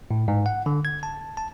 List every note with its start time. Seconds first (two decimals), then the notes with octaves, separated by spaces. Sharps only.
0.11 A2
0.28 G#2
0.46 F#5
0.66 D3
0.85 G#6
1.03 A5
1.37 A5